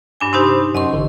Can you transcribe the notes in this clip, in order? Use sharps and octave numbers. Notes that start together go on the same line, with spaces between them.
G2 D4 G#5
C3 D#4 G4 C5 B5 C6
F#2 D#5 C6 C#6
A1 D3